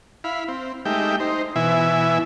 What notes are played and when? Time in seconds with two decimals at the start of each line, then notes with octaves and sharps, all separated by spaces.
0.24 E4 F5 B5
0.48 C4
0.85 G#3 A3 D#4 G4 E5 G5
1.20 D#4 C5
1.56 B2 E3 E4 E5 G#5